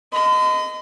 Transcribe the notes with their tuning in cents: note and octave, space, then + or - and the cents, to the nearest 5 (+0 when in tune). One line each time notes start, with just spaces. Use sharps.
D#5 +0 C6 -45